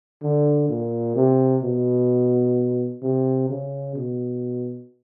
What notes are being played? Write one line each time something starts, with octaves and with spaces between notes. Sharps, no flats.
D3
A#2
C3
B2
C3
C#3
B2